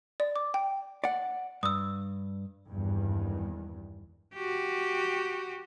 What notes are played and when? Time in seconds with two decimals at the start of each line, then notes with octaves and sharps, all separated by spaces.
0.20 D5
0.36 D6
0.54 G5
1.04 D5 F#5
1.63 G2 D#6 E6
2.69 G#1 E2 G2
4.34 F#4 G4